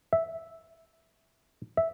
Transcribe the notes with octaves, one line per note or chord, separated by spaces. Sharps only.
E5
E5